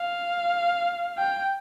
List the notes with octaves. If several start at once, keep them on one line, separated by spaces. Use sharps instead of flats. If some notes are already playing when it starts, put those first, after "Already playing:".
Already playing: F5
G5